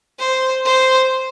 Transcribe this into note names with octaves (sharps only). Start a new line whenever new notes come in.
C5
C5